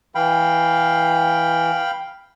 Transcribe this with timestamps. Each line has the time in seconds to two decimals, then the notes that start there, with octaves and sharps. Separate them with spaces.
0.15 E3 F5 G5 B5